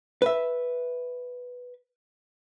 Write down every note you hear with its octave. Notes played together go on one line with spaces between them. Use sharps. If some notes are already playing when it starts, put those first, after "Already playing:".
B4 E5